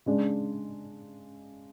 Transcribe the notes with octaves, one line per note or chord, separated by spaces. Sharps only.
C#3 G#3 D4